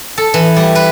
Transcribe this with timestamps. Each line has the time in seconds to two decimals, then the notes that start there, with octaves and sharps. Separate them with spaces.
0.18 A4
0.34 E3
0.56 G3
0.75 B4